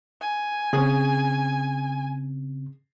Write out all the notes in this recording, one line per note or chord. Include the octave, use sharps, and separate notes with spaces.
G#5
C#3 C4 C#4 G#4